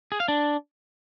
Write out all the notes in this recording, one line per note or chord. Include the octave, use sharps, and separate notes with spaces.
G#4
F5
D4